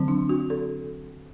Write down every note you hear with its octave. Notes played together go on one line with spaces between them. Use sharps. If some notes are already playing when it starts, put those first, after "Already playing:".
Already playing: D3 F#3 C4
D4
F#4
A4